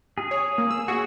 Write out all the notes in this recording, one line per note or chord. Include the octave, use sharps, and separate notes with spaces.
G#4
C#5
A#3
E6
F#4 G#4